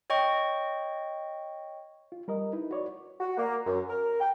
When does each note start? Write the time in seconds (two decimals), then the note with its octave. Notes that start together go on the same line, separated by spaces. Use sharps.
0.10 C#5 D#5 G5 C#6
2.12 F4
2.28 G3 A#4 D#5
2.53 D#4 E4 B4
2.71 F#4 C#5 D5
3.20 F#4
3.38 A#3
3.67 F#2
3.90 A#4
4.20 G5